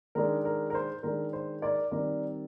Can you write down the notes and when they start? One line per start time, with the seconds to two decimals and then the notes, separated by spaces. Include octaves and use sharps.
0.15 D#3 G#3 D4 A#4
0.45 A#4
0.70 A#4
0.74 C5
1.03 D#3 G#3 D4 A#4
1.33 C5
1.62 A#4 D5
1.91 D#3 G3 C4 A#4 D5